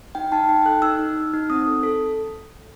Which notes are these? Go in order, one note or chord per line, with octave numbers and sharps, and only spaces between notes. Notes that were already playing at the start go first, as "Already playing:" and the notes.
D#4 G5
D#4 A5
D#4 G5
A4 F#6
D#4 E6
D#4
D#4
D#4
C4 D#6
A4
A4